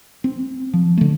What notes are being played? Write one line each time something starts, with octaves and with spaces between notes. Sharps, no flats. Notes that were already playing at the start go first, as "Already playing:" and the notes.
C4
F3
D3 A3